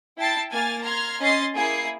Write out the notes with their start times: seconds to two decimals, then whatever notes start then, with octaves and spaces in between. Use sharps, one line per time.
0.18 E4 G5 A5 A6 C7
0.51 A#3 G#5 F6 A6
0.83 A#5 C6 F6 G#6
1.21 C#4 D#5 C6 A6 C7
1.55 A#3 E4 G#4 C7